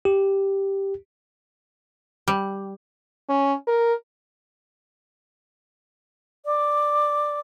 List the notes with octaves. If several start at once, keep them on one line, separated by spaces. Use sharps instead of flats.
G4
G3
C#4
A#4
D5